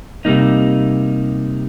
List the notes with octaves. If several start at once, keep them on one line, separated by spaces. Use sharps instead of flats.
C3 G3 A#3 D#4